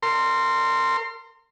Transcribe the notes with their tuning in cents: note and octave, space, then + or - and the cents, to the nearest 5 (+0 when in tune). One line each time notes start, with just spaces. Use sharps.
A#4 -35 C6 +0